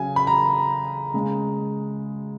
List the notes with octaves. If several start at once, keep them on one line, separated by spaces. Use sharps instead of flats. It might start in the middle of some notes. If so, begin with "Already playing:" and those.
Already playing: C#3 F#3 G#5
B5
A#5
C#3 G#3